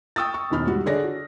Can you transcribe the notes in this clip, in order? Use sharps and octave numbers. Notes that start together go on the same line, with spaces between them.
G5 C#6 D#6 E6 A6
C#6
E1 E2 D#3 B5 F6
G#2 G3 F#4
D3 G#4 C#5 D5 A#6
F#4